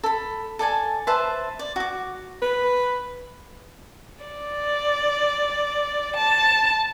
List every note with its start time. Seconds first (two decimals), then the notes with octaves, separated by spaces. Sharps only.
0.03 A4 B5
0.59 A4 D5 G#5 A5
1.07 B4 C5 E5 A5
1.59 D5
1.76 F#4 D6
2.42 B4
4.25 D5
6.16 A5